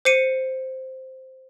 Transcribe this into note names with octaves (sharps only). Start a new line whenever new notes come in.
C5 C7 C#7 D#7